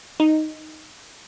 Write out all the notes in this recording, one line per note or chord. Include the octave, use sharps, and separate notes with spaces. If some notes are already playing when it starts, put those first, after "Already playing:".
D#4